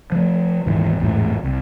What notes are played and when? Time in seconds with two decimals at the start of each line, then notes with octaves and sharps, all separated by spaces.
0.12 F3 A3
0.66 D#1 D#2 G#2 E3
1.00 A1 E2 G#2 A3
1.43 C2